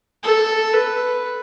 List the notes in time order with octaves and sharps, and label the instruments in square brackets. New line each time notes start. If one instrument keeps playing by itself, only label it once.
[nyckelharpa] A4
B4